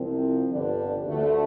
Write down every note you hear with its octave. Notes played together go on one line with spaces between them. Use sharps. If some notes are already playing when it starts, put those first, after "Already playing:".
Already playing: C2 C3 F3 C4
G1 F2 D3 G3 D4
D2 D3 A3